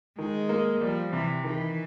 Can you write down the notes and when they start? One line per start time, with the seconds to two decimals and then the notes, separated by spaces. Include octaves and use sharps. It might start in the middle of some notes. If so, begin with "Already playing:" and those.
0.18 D#3 G#3
0.49 A#3
0.81 F3 G3
1.13 C3 E3
1.44 D#3 E3